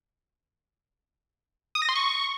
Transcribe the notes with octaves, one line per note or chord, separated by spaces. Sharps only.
D#6
A#6
C6
C#6